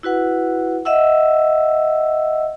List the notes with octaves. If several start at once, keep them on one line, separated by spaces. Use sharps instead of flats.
E4 F#4 B4 F#5
D#5 E5 F#5 E6